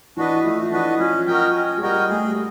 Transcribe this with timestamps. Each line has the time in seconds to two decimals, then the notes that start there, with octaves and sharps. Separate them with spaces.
0.16 E3 D4 F#4 B4 D#5
0.44 F3 A3
0.72 E3 D4 F#4 B4 D#5
0.99 F3 C#4
1.27 F3 F#4 A#4 D#5 G5
1.55 C#4
1.77 G#3
1.82 G3 F#4 A#4 D#5 G5
2.09 A3 G#4
2.28 G3